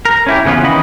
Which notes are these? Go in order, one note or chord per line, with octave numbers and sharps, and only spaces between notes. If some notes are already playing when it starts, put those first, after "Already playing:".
A#4
C#4 E4 G4
C#3 E3 B3 C#4 F4
D#3 E3 C#4 D#5 B5